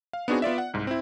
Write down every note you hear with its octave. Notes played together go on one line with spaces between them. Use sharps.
F5
B3 C4 D4 D#4 F#4 G#4
B3 F4 D5 E5
F#5
C2 G#2
C4 E4